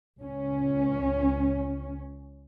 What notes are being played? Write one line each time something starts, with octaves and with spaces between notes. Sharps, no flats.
C#2 C#4